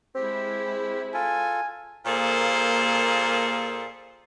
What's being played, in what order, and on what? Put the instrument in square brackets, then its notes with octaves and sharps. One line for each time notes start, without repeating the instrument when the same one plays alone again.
[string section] G#3 E4 [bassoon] C4 [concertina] G4
[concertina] F4 A4 [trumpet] G#5
[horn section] A#2 A#3 G#4 A4 C5